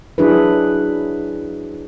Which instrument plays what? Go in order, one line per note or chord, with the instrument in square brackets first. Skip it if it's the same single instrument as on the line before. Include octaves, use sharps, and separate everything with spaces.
[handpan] F#3 D4 E4 G#4 B4